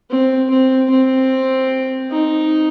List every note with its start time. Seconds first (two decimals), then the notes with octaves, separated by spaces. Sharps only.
0.10 C4
0.50 C4
0.90 C4
2.10 D#4